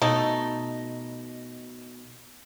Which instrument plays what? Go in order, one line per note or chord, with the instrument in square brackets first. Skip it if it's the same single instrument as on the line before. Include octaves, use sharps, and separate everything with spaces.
[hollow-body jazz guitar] B2 [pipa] A3 D#4